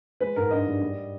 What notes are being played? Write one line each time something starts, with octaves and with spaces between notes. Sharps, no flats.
G#3 B4
G#2 A#4
G2 D#5
G3
G3